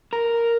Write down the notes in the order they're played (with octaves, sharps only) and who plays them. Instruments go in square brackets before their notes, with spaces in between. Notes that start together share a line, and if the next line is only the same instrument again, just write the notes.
[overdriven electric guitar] A#4